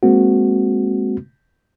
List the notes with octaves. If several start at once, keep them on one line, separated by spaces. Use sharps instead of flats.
G#3 A#3 C4 F#4